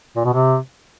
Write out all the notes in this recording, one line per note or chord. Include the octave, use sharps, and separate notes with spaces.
A#2
B2
C3